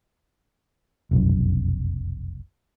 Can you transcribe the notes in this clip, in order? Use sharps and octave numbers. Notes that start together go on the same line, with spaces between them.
F1 B1 F#2